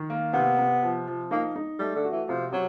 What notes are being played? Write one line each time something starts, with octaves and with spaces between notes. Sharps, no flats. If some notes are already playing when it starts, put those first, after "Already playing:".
Already playing: D#3
A#3
C3 B3
C3
F3
F3
A#3 D#4
D#4
G3 A3
D3
F#4
E3
C3 F3
C3 F#3